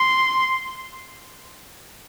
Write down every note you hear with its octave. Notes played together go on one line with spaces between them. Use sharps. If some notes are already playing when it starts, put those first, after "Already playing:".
Already playing: C6